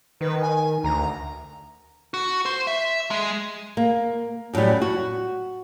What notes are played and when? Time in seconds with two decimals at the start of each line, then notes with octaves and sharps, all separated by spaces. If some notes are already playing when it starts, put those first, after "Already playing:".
0.21 D#3 B4
0.42 G#5
0.84 D2 A#5
2.14 F#4
2.46 C5
2.67 E5
3.11 G#3
3.77 A#3
4.53 F#2 A2 E3 F#3 G3
4.82 F#4